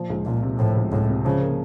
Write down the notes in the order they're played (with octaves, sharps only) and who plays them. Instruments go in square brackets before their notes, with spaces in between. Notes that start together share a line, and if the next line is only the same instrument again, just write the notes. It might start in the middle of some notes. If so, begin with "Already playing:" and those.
Already playing: [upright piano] A#2 F3
C#2
[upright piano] C#2 [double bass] A#2
[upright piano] C3
[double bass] A2 [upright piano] F3
[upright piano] C#2
[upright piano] C#2 [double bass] A2
[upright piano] C3
[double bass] C#3 [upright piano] F3
[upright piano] A#3